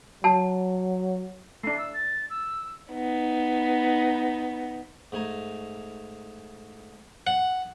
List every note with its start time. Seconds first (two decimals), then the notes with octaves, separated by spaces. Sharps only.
0.24 F#3 A5
1.64 A3 D4 C7
1.78 E6
1.94 A6
2.30 E6
2.93 B3 D#4
5.12 G#2 A3 G#5 A#5
7.27 F#5